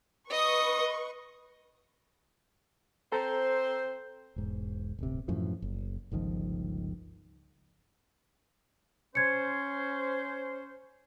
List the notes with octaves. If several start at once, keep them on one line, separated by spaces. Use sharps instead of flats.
B4 D#5 C#6 D#6
C4 A4 C5 A#5
E1 G#2
D1 G1 C3
F#2 A2 E3 F3
F#1
G1 C#2 D#3 F3
C#4 C5 G#6 C#7